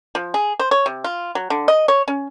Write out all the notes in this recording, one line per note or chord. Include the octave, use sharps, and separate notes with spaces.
F3
G#4
C5
C#5
C3
F4
F#3
D3
D#5
C#5
C#4